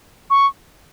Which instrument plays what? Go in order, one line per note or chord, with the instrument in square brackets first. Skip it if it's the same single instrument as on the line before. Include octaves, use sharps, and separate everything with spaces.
[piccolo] C#6